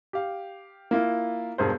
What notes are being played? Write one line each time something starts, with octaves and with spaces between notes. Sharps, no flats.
G4 F5
A#3 E4 F4
E1 G2 G#4 A#4 C5